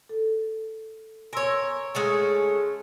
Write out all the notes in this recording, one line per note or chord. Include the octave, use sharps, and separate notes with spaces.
A4
A#4 C#5 G#5 C6 E6
G#3 A3 C#4 G#5